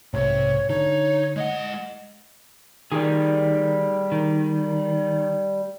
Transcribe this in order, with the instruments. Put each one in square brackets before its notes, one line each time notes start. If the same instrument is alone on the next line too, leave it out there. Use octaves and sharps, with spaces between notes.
[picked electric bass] B1 G#2 [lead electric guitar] C3 [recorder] C#5
[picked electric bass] D3 [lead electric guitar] D#4 [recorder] C#5
[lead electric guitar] G#3 F#5 [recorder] D#5
[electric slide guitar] D#3 [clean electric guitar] G3 G4 G#4
[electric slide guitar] D#3